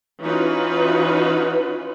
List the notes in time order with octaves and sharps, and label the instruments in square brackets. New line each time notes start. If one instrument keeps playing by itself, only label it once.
[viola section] E3 C#4 D#4 F4 F#4 B4